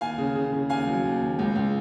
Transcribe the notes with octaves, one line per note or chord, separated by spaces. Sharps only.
D#2 F5 G#5
C#3
C#3
C#3
D#2 F5 G#5
F#3
D#2
D#2
C#2
C#2